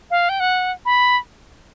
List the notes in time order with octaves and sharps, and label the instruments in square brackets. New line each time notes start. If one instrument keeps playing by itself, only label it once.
[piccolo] F5
G5
F#5
B5